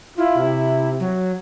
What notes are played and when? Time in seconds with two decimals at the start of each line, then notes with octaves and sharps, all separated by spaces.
0.18 E4 F4
0.38 C3
1.00 F#3